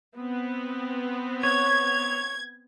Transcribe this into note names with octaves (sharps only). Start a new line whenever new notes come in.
B3 C4
C#5 G#6